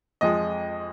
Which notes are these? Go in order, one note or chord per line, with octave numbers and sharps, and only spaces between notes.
F2 F3 G#3 D#5